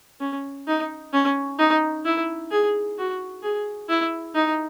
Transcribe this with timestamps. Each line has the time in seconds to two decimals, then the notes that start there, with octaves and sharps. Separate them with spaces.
0.20 C#4
0.67 D#4
1.14 C#4
1.59 D#4
2.05 E4
2.51 G#4
2.98 F#4
3.43 G#4
3.89 E4
4.35 D#4